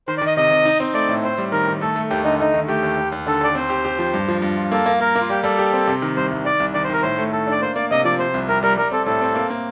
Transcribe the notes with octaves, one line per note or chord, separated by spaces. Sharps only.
D#3 C5
D5
D#3
D#5
C3 D#5
C3
D#4
C4
A3 D5
A2
C4 C5
G3
D#3 A#4
D#3
A3 A4
A3
D#2 G4
D3 D#4
A3 D#4
D#3
A3 G4
D#2
D#2
D#2
D3 A4
D#2 D5
C4 C5
G4
G4
F3
G2
F3
G2
F4
A#3 A4
A#3
A#3 A#4
A#3
F4
G3 G4
G3 A4
G4
C4
C3
D#3
C2 C5
C2
D#3 D5
C2
D#3 D5
C5
D#3 A#4
A2 C5
A3
A3 A4
D4 D5
A#3 C5
A#3 D5
C3 D#5
F3 D5
C3 C5
C2
C2 A#4
G3 A#4
G3 A#4
C4 A4
A2 A4
C4
A#3
A#3